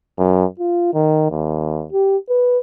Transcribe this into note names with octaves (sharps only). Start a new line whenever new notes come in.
F#2
F4
D#3
D#2
G4
B4